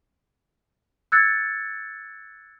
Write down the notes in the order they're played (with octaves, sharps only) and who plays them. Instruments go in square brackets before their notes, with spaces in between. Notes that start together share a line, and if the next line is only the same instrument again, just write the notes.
[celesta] E6 F#6 G#6 A6 C#7